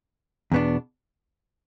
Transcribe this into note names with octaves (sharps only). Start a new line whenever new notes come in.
E2 B2 B3 D4